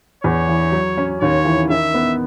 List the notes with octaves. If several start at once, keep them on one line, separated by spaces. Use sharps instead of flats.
E2 C#5
E3
F#3
C#4
D#2 C#5
E3
D#3 E5
B3